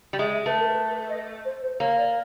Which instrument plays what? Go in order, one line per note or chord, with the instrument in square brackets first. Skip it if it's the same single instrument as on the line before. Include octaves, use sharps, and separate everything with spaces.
[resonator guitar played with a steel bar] G3
[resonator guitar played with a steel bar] G#3 [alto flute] E5
[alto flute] E5
[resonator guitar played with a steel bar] A3 [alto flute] B4
[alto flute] A#4
B4
B4
D#5
C5
C5
[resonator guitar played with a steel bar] A#3 [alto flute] C#5
[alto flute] D5